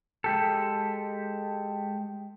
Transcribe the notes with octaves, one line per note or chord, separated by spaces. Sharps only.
G#3 G4 A4